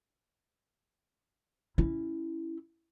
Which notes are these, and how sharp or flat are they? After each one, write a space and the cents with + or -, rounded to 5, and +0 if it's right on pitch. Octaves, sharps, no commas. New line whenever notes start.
C#4 +0 E4 +0